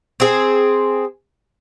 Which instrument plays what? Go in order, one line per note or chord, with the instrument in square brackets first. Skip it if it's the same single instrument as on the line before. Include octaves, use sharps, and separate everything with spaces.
[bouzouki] C4 G#4